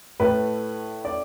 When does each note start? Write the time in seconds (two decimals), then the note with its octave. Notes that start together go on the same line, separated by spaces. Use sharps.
0.20 A2 A3 B4
1.05 D5